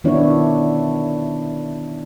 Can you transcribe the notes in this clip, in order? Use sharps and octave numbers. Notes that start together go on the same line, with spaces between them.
D#3 B3 D4 E4 F#4 C#5